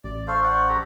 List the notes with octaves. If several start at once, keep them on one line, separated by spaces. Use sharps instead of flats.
A1 D5
A4 C5 F5 C#6
C5 D5 F#5
G4 A4 A#5